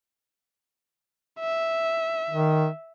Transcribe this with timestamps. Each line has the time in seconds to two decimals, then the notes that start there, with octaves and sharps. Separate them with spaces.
1.40 E5
2.30 D#3